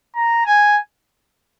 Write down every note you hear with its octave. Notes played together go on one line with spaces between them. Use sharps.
A#5
G#5